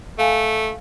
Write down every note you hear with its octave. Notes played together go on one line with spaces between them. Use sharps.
A3 F5 G#5